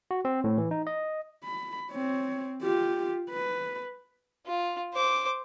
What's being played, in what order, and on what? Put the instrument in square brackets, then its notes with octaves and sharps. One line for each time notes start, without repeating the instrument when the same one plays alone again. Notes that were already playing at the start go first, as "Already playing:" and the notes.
[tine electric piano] F#4
C4
A2
E3
D#4
D#5
[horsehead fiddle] B5
C4 C#5
F4 G4
B4
[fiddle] F4
C5 D6